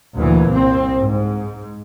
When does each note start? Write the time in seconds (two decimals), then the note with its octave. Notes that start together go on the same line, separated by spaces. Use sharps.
0.17 D2 A#2 E3
0.52 C2 C4
0.97 G#2